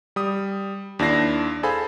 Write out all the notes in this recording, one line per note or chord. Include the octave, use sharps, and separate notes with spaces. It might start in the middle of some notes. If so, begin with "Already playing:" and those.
G3 D#6
D#2 D4 E4 A#6 C7
G#4 A4 C5 F5 G#5 B5